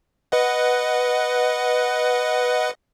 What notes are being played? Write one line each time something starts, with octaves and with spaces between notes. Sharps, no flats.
B4 D#5 F#5